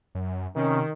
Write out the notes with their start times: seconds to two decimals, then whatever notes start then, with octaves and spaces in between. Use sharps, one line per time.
0.15 F#2
0.56 C3 D#3 C#4